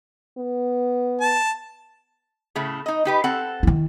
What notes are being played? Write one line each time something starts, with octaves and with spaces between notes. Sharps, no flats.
B3
A5
A2 C#3 A3
D#4 D#5
D#4 G4 B4
C4 A4 F#5
D#3 E4